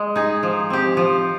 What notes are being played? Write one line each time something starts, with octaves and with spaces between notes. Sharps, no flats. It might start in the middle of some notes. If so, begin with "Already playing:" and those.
Already playing: G#3
D#4 G#4
F3
C4 G4
F3